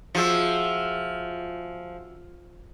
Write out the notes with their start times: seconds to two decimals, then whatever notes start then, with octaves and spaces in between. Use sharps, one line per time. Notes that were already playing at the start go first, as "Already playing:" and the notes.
0.15 F3 F#4 G#4 E5